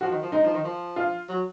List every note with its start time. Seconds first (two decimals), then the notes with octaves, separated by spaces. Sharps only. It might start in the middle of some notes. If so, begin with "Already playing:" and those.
0.01 F3 F#4
0.11 D#3
0.22 F3
0.32 G#3 D#4
0.44 F3
0.53 D#3
0.64 F3
0.96 F4
1.29 F#3